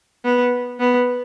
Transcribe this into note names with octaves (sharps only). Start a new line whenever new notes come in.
B3
B3